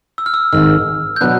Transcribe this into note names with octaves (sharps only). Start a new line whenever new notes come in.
E6
F6
E6
G#1 G#2 D#3 F6
G6
B2 F#3 B3 D4 F#6